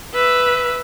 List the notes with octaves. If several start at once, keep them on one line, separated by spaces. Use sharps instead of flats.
B4 E5